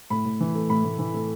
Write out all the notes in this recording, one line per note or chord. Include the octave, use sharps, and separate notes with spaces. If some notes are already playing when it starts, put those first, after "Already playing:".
A2 B5
A2
E3
A3
A2 B5
A2
E3
A3